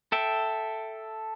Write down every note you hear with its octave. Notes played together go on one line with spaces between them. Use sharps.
A4 E5 G5